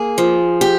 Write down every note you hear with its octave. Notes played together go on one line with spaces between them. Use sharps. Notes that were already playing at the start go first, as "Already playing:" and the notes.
Already playing: A#3 G#4
F3
G4